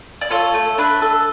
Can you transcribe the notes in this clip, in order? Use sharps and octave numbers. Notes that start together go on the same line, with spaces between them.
D5
F4 A4 C#5
A3
D4 B4
A4